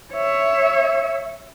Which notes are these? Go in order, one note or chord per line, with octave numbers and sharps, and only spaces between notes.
C#5 E5